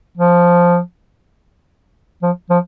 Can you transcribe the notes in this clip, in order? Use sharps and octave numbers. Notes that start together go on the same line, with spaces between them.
F3
F3
F3